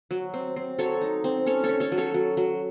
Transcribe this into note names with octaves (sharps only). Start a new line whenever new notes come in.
F#3
C4
C4
F#3 A4 C#5
D#4
C4
C#4 A4 C#5
A4 C#5
C#4
A4 C#5
F#3
A4 C#5
F#3
F#3